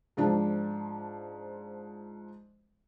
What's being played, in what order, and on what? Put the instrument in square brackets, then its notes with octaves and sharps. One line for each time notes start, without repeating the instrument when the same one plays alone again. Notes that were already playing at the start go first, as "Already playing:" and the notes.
[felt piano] G#2 F3 D4